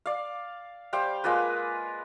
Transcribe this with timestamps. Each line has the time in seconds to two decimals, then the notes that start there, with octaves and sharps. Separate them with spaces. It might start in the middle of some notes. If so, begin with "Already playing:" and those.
0.06 D5 F5
0.93 G3 C5 F5 G5
1.24 G#3 A#3 F4 B4